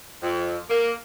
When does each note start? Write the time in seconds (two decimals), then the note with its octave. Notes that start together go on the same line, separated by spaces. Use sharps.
0.22 F2
0.69 A#3